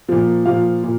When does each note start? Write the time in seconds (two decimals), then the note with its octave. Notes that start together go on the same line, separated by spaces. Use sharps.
0.08 A#2 F3
0.45 A#2 F3 F5
0.83 A#2